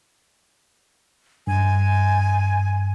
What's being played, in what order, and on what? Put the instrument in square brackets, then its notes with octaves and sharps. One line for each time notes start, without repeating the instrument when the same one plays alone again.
[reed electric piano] G2 [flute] G#5